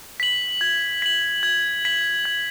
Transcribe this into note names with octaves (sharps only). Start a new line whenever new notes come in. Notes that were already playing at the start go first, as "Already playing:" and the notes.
B6 F#7
G#6
B6 F#7
G#6
B6 F#7
G#6